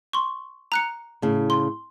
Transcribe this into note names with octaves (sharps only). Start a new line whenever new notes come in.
C6 C#6
A#5 F#6 C#7
A2 C#3
C6